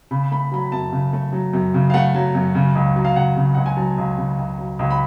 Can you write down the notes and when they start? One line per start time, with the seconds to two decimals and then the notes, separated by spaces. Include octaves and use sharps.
0.11 C#3 B5
0.32 A3 B5
0.52 F#3 B5
0.72 F#2 A5
0.92 C#3
1.13 A3
1.33 F#3
1.53 F#2
1.74 C#3
1.90 F5
1.94 A3 F#5
2.15 F#3
2.35 F#2
2.55 C#3
2.75 C#2
2.96 F#3
3.05 F5
3.16 C#2 F#5
3.36 C#3
3.54 C#2 F#5
3.66 G#5
3.77 F#3 A5
3.98 C#2
4.18 C#3
4.38 C#2
4.58 F#3
4.79 C#2
4.91 B5